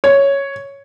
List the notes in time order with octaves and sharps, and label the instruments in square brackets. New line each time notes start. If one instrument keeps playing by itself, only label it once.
[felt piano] C#5